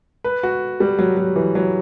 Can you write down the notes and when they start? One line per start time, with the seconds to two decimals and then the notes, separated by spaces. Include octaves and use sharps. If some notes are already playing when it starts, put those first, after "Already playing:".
0.24 B4
0.43 F#4
0.80 G3
0.99 F#3
1.17 F#3
1.36 E3
1.55 F#3